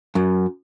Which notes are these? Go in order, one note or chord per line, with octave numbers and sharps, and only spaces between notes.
F#2